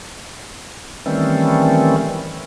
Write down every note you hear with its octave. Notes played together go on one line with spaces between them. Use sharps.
D#3 E3 G3 A3 C4 C#4